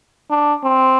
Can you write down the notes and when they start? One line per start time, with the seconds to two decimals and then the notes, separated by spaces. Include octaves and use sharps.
0.30 D4
0.64 C4